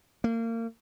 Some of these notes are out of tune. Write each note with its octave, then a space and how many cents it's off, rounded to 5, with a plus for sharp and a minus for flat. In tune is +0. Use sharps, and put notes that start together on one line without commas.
A#3 -30